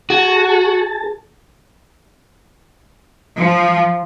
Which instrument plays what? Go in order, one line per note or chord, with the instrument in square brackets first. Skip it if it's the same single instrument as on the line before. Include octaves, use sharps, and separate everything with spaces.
[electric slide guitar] F#4 [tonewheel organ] G#4 A5
[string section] F3